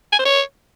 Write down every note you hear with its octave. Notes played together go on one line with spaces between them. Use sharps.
G#5
C5
C#5